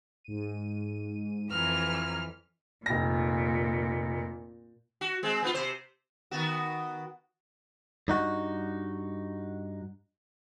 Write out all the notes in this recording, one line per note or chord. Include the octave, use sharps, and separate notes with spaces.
G#2 D#7
F2 E3 A#5 F6 G#6
F1 A#2 A#6
F#4
G#3 C4
B3 E4 F4
C3 C5
D#3 B3 F#4
G2 D#4 F#4